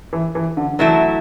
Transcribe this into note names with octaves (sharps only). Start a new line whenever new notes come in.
E3
E3
D3
E3 F#3 A3 E4